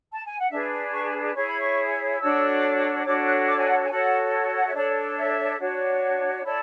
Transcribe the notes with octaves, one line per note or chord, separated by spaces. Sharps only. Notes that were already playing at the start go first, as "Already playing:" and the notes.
A5
G#5
F#5
D4 G#4 B4 E5
C#6
E4 G#4 C#5 C#6
B5
C#6
D4 F#4 A4 C#5 E6
D4 F#4 A4 C#5 D6
F#6
D6
G#5
F#5
G#5
F#4 A4 C#5 F#5
F#5
E5
D4 A4 C#5 D5
E5
D4 F#4 C#5
E4 A4 C#5 D5